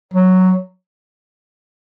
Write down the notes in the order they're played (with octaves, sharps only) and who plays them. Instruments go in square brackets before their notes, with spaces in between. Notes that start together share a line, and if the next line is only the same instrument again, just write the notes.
[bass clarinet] F#3